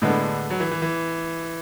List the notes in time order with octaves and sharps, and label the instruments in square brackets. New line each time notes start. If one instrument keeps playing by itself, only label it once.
[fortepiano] A2 G#3 B3 D4 [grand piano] D3
[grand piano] F#3
E3
E3
E3